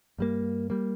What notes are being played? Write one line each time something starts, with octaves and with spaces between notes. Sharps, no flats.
G2 G3 A#3
G3 A#3